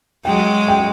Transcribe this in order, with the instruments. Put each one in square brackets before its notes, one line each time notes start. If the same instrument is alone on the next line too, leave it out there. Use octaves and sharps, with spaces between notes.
[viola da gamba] F#3 G#3 [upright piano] G5
[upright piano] G5